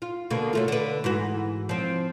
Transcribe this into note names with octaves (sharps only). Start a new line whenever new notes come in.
F4
B2 D3 A#3
F#3 A3 F4
D3 B4
G#2 E3 F#4
F3 C4